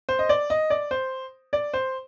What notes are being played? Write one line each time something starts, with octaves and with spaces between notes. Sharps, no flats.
C5
D#5
D5
D#5
D5
C5
D5
C5